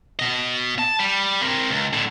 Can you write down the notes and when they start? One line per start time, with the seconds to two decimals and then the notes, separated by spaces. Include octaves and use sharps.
0.19 B2 D#5
0.79 A5
1.00 G3
1.42 C4 A#4
1.70 C#2
1.93 A2 D3